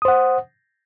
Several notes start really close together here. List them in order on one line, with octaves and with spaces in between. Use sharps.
D#6 C5 F#5